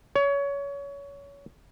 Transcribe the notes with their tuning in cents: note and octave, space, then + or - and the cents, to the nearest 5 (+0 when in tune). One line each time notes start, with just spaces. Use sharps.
C#5 +25